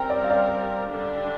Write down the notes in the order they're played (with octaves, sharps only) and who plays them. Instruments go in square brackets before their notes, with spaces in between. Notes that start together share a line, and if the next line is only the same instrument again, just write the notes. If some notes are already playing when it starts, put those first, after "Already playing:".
Already playing: [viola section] G3 C4 A#4 [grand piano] G5 A#5
[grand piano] D5
F5
D5
[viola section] D3 G3 D4